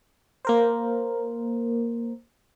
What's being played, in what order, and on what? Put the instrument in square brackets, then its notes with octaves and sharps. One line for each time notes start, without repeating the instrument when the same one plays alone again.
[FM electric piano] A#3 A#4 C5